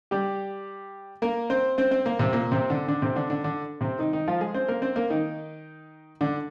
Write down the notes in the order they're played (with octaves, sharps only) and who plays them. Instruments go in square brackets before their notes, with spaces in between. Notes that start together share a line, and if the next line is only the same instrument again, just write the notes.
[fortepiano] G3 G4
A#3 A#4
C4 C5
C4 C5
C4 C5
A#3 A#4
C3 C4
A#2 A#3
C3 C4
D3 D4
D3 D4
C3 C4
D3 D4
D3 D4
D3 D4
C3 C4
D#3 D#4
D#3 D#4
F3 F4
G#3 G#4
C4 C5
A#3 A#4
C4 C5
A#3 A#4
D#3 D#4
D3 D4